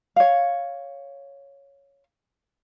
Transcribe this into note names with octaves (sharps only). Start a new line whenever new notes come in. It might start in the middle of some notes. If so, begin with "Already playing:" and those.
C#5 F5